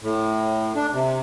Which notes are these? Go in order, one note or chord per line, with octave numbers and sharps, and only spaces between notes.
A2
D4
C3